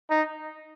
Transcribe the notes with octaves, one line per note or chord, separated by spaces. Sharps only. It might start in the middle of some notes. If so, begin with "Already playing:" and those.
D#4